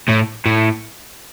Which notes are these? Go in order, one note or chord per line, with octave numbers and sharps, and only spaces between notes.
A2
A2